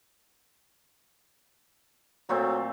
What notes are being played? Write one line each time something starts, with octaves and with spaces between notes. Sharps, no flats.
A#2 F#3 A3 C4